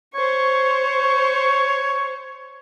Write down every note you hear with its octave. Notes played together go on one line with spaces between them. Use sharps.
C5 C#5 C#6